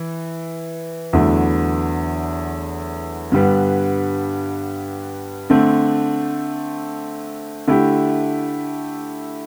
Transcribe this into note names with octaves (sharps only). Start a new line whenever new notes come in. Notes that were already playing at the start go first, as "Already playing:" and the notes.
Already playing: E3
E2 D3 F#3 A3 E4
G2 D3 G3 B3
D3 A3 C4
D3 A3 E4 G4